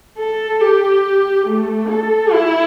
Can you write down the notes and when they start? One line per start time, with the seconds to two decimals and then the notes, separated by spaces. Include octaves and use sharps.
0.18 A4
0.61 G4
1.47 A3
1.89 A4
2.32 E4